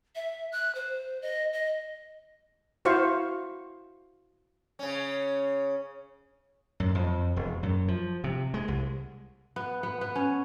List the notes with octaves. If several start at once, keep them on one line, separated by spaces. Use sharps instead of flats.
E5
F#6
C5
D#5
D#5
E4 F#4 C5 F5 C#6
C#3 C#4
F#2
F2
E1
F#2
F3
C3
G#3
C2
B3
B3
B3
C#4